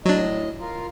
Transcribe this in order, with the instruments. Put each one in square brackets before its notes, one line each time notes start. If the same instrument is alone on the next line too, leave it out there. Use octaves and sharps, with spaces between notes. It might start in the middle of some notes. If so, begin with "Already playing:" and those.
[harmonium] A2 D#5 [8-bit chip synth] F#3 D4
[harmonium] F4 A#4